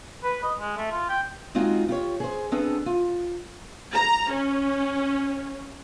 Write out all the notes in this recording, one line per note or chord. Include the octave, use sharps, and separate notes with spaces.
B4
D#5
G#3
A3
F4
G5
G#3 C4 D#4 F4 F#4
F4 G4 C#5
G#4 C5
B3 C4 D4 G#4 A4
F4
A#5
C#4